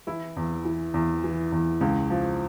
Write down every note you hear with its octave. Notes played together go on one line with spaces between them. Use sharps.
E3 E4
E2
E3
E2
E3
E2
C#2
F3